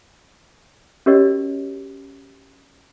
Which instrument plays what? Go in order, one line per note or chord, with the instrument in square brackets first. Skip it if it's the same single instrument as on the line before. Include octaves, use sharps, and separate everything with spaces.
[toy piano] C#4 F#4 G4 A#4 C#5 D#5